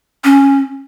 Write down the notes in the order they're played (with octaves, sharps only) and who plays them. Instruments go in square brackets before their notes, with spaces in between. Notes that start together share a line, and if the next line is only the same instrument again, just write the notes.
[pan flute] C#4